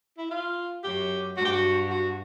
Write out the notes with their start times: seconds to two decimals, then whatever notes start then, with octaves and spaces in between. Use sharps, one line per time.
0.18 E4
0.31 F4
0.84 F#2 G4
1.37 G2 F#4
1.45 G4
1.52 F#4
1.90 F#4